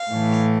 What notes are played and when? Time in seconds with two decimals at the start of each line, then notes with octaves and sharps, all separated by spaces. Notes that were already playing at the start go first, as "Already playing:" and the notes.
Already playing: F5
0.11 A2 E3 A3